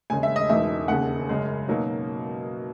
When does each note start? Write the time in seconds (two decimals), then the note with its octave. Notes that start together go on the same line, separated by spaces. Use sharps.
0.10 E1 D#2 C#3 G#3 C#4 G#5
0.23 E5
0.36 D#5
0.49 E1 E2 B2 G#3 D#4 E5
0.88 E1 D#2 C#3 F#5
1.29 F#2 C#3 G#3
1.68 B2 F#3 A#3 D#4